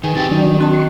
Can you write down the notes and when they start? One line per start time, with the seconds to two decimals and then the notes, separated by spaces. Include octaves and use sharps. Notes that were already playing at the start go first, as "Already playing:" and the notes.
0.04 D#3 G#4 B4 G#5
0.15 D#3 C4 G4 A6
0.31 D#3 F#3 D4
0.59 C4 F#4 A5
0.73 C6 C#6